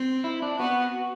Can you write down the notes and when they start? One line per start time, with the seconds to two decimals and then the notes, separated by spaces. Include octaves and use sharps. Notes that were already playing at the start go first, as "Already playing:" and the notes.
Already playing: C4
0.24 E4
0.42 D4
0.58 B3 F#4